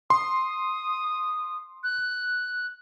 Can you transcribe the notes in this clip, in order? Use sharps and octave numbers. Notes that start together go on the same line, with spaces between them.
C6 D#6
F#6